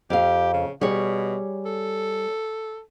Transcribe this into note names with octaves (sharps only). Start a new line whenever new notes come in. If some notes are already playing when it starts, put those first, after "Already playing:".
F2 G4 F5
C#3
B2 G3 G#4 C#5
A4